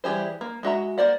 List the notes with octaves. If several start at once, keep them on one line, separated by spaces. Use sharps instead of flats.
E3 G3 G4 G#4 C5
A#3
G#3 F#4 E5 A#5
A#3 C5 D5 F#5